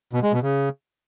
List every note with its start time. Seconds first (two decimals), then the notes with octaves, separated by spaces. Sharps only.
0.13 B2
0.23 G#3
0.33 B2
0.43 C#3